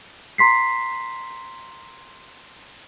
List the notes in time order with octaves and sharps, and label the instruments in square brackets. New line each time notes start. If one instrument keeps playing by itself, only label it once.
[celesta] A#5 C6 B6 C7